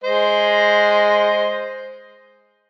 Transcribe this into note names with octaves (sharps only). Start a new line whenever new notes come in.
G#3 C5 D#5